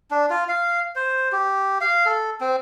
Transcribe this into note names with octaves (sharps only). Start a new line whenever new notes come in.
D4
F4
F5
C5
G4
F5
A4
C4